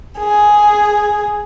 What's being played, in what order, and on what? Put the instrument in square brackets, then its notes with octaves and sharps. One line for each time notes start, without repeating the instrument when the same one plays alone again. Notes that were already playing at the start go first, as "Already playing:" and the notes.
[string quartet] G#4